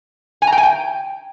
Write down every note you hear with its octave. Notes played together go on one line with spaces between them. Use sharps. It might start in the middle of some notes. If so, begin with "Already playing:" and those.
G#5
A#5
G5
G#5
G5